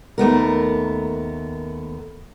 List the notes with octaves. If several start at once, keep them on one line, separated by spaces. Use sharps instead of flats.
D#2 A3 B3 A#4